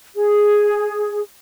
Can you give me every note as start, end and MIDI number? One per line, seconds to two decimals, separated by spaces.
0.14 1.20 68